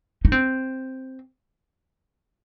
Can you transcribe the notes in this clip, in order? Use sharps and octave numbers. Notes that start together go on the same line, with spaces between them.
D#4
C4